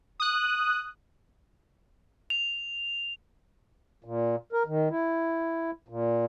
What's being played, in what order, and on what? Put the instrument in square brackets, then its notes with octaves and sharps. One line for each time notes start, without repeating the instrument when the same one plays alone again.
[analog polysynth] D#6 F#6
[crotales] F7
[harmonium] A#2
A#4
D#3
E4
A#2